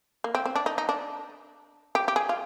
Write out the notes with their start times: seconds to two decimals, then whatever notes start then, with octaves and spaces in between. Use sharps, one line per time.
0.24 A#3
0.35 C4
0.46 C4
0.55 D4
0.66 D#4
0.78 D#4
0.89 D4
1.95 G4
2.08 G4
2.16 G#4
2.29 F4